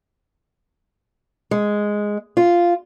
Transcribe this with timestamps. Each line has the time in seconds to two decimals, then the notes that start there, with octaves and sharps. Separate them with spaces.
1.51 G#3
2.37 F4